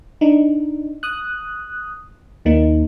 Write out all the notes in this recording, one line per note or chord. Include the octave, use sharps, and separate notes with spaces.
D4 D#4
D#6 F#6
D#2 A#3 D#4